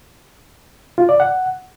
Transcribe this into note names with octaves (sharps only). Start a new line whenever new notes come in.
F4
D5
F#5